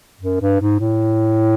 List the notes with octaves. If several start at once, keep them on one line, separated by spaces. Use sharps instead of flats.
F#2
G2
G#2
A2